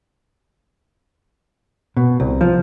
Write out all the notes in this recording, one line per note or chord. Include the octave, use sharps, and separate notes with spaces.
B2
C2
F3